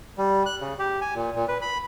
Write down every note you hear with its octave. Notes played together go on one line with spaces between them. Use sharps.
G3
F#6
C#3
G4
G#5
A#2
A#2
B4
B5